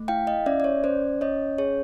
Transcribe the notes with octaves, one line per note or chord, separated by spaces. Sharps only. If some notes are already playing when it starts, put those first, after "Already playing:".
Already playing: A3
E4 F5 G5
D#5 F5
C#4 D5 E5
D5
C#5
C#4 C5 D5
C#4 C#5 D#5
G#4 C#5